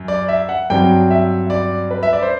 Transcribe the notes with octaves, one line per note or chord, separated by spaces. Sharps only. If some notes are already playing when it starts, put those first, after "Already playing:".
Already playing: F#2
D5
E5
F#5
G2 F#3 C4 G5
E5
D5
B4
E5
D5
C5